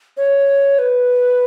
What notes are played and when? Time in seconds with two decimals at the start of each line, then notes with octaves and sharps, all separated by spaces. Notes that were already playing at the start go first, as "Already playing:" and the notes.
0.17 C#5
0.79 B4